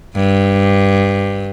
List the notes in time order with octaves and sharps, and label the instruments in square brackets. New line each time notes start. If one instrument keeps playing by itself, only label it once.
[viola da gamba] G2